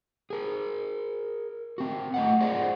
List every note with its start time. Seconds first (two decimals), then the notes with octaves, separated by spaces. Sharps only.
0.30 G#4 A#4
1.78 C4 F#4
2.14 A3 D#5 F#5
2.40 F4 G#4 C5 D5 D#5 F#5